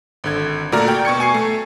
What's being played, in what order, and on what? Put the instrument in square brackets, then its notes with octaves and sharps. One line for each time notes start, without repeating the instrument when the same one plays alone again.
[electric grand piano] G#1 D3 G#6
A#2 A3 F#4 D5 A#5 F6
G5
B2 C#6 G#6 C#7
G#5 C#6 C7
A3